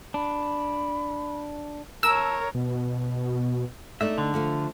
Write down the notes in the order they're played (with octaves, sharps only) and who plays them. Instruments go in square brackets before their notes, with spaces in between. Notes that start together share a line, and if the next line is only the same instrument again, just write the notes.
[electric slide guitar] D4 [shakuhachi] B5
[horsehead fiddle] A#4 C#5 [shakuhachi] A5 [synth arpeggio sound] E6
[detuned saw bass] B2
[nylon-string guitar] A3 D4 D#4 [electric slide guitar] E5
[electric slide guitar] D3
[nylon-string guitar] F3 A3 F4